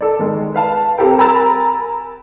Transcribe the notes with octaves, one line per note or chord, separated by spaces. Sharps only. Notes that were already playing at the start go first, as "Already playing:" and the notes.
A4 D5
D#3 G#3
B4 F5 A5
C4 G4 A4 A#4 G5
A#4 G#5 A#5 B5 E6 A6